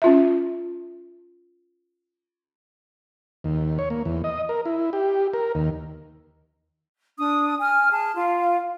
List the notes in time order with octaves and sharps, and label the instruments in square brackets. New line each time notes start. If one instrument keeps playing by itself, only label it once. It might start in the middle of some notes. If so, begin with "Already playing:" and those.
[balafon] C#4 F4 E5
[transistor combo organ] D#2
C#5
A#3
E2
D#5
A#4
E4
G4
A#4
D#2
[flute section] D4 D#6
G#5 F6
G#4 A5
F4 F5